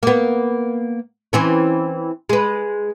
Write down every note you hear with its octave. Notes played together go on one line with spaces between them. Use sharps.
A#3 B3
E3 C4 C#4
G#3 B4